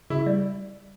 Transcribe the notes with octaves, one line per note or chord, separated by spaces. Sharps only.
C#3 E4
G3